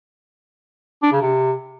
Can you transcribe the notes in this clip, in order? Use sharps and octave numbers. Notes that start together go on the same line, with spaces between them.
D4
C#3
C3